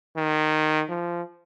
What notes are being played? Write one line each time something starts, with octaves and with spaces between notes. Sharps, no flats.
D#3
F3